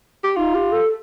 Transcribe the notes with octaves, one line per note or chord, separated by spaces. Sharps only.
G4
D#4 F4
G4
A4